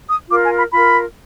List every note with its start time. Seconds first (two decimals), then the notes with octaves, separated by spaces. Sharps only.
0.09 D#6
0.29 F4 A#4 D6
0.43 G#5
0.57 B5
0.72 F4 A#4 B5